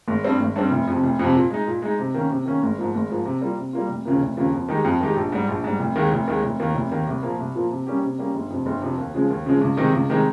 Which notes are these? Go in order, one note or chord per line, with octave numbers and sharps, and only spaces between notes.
G#1
G2 G3 C4
G#1
G2 G3 C4
F1
F2 C3
F1
F2 C3
A#2
G#3 D#4
A#2
G#3 D#4
C3
D#3 A#3 C#4
C3
D#3 A#3 C#4
G#1
G#2 F3 A#3
G#1
G#2 F3 A#3
C3
G3 A#3 F4
C3
G3 A#3 F4
F1
D#2 C#3 F3 A#3
F1
D#2 C#3 F3 A#3
F2
D#3 G#3 D#4 G4
F2
D#3 G#3 D#4 G4
A#1
G#2 G3
A#1
G#2 G3
F1
D#2 D#3 G#3
F1
D#2 D#3 G#3
F1
D#2 D#3 A#3
F1
D#2 D#3 A#3
C2
A#2 F3 A#3
C2
A#2 F3 A#3
C3
G3 A#3 C#4 G4
C3
G3 A#3 C#4 G4
G1
F2 C3
G1
F2 C3
D#2
C#3 F3 G#3
D#2
C#3 F3 G#3
C#2
C3 D#3 G#3 D#4
C#2
C3 D#3 G#3 D#4